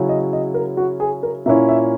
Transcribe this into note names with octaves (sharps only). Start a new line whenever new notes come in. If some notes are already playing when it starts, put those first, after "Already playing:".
Already playing: C#3 F#3 C#4 E4
D#5
D#5
A#4
F#4
G#4
A#4
A#2 A#3 C#4 E4 E5
E5